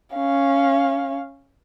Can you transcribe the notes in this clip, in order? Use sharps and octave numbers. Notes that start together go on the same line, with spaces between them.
C#4 F5